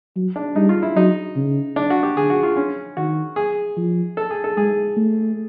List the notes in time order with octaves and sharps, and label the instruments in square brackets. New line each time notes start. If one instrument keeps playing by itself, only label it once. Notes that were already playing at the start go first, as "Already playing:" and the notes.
[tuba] F#3
[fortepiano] D4
[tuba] G3 [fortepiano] D#4
[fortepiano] F4
E4
[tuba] F#3 [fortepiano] D#4
[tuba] C#3
[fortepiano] D4
F#4
G4
[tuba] D3 [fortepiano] G#4
[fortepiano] F#4
F4
C#4
[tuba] D#3 [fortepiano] F#4
[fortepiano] G#4
[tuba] F3
[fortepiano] A4
G#4
A4
[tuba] G#3 [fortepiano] G#4
[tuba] A3